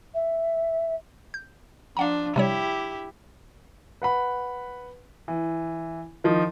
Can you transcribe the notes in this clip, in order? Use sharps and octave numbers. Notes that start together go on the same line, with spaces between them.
E5
G6
F3 D4 F5 F#5 A#5
C3 G3 E4 G4 C#5
B4 F#5 B5
E3
D#3 F3 D#4